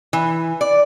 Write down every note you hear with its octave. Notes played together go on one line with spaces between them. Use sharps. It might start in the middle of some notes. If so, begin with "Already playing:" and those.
E3
D5